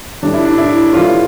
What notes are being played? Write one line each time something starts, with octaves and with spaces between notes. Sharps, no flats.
A2 G3 D4
E4
D4
E4
A2 E3 G3 F4